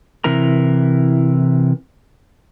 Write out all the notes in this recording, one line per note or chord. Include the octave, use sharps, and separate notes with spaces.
C3 E3 E4 A#4 A#5